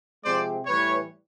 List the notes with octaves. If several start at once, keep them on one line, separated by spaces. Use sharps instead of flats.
C3 F3 G#3 C4 C5 D5
A2 E3 G3 B4 C#5